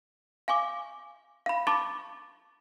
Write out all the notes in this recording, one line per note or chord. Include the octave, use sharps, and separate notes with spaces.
F5 G#5 C#6 D6
F5 B5
A5 B5 C#6 D6 A6